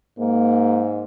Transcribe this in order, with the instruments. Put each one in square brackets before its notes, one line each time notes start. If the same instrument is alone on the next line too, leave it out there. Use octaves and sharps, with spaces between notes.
[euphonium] G#2 [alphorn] A#3